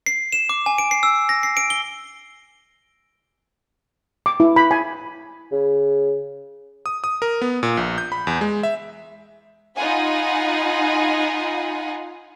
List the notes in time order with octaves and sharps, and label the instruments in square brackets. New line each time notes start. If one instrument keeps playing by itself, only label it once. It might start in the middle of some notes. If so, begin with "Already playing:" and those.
[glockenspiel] C7
E7
D6
G#5
D7
C7
E6
A#6
C7
D7
G7
[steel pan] D6
E4
B5
G#5
[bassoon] C#3
[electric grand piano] D#6
D#6
A#4
B3
A#2
A#1
G6
B5
E2
G#3
E5
[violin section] D#4 F4 F#5 G#5 B5